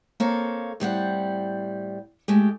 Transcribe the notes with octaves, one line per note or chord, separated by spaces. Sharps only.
A#3 C4 A4 C#5 F5
A2 G3 C4 F#5
G#3 A3 G4